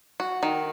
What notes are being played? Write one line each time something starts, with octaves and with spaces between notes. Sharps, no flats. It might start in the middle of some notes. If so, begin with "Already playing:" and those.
F#4
D#3